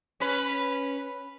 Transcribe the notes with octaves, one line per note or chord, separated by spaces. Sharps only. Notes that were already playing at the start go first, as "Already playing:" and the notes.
C#4 B4